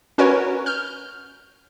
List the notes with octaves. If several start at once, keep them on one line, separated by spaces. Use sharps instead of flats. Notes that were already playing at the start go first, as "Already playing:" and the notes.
C#4 F#4 A#4 B4 C#5
F6 G6